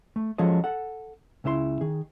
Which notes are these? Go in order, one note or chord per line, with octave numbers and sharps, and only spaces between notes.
A3
F3 F#3 G#3 C#4 A4 D#5
A4 F#5
C#2 C#3 E4 C5 C6
D#3 G#4